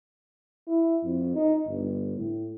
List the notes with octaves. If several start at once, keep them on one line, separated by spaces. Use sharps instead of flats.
E4
F2
D#4
G1
A2